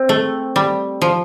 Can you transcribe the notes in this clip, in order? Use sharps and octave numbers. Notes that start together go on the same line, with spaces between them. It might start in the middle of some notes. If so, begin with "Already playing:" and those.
Already playing: C4
A3
G3
F3